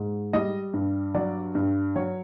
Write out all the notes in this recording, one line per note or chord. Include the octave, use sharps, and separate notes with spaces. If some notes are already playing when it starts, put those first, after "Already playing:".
Already playing: G#2
G3 D#5
G2
F#3 D5
G2
F#3 C#5